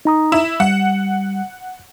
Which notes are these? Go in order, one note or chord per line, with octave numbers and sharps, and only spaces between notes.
D#4 A#5 D#6
E4 E7
G3 F#5